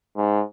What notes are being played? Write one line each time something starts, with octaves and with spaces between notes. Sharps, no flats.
G#2